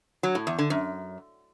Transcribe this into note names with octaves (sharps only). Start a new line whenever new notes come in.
F#3
A2
E2
D3
F#2